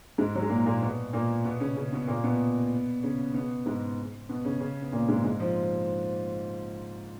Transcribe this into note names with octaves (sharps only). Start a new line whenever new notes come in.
G#2 G#3
F#3
G#3
A#2 A#3
A#2 A#3
B2 B3
A#2 A#3
B2 B3
C#3 C#4
C#3 C#4
B2 B3
A#2 A#3
B2 B3
C#3 C#4
B2 B3
G#2 G#3
B2 B3
C#3 C#4
C#3 C#4
B3
A#2 A#3
G#2 G#3
G#2 G#3
F3